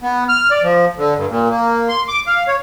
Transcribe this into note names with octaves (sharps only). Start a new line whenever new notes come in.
B3
F6
D5
F3
D3
G2
A#2
A#3
C6
D6
F5
C#5